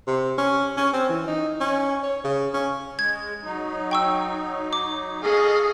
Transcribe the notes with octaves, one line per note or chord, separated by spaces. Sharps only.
C3
C#4
C#4
C4
E3
D#4
C#4
C#5
C#3
C#4
G#3 G#6
F#3 D#4
G5 C#6 E6
D6
G#4 A4 D#5 F5 C#6